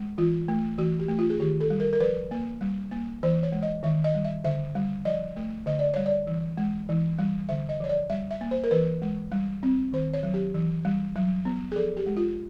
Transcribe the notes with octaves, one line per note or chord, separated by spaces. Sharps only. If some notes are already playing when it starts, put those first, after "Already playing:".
Already playing: G#3
E3 F4
A3
E3 F#4
G4
A3
F4
G#4
D#3 G4
A4
G3
A#4
A#4
F3 B4
A#3
G3
A#3
E3 C5
C#5
G#3
D#5
D#3 E5
D#5
G3
E5
D3 E5
G3
F3 D#5
A3
D3 D#5
D5
G3 C#5
D5
E3
G#3
E3
G3
D3 E5
D#5
F3 C#5
D5
G3 E5
E5
A#3
C5
A#4
E3 B4
G#3
G3
C4
D#3 C5
C#5
F#3
G4
E3
G3
F#3
B3
G#4
F3 A4
G4
G#3
F4